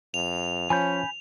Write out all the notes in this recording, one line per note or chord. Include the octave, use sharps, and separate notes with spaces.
F2 F7
F3 C#4 G#5 B5 G6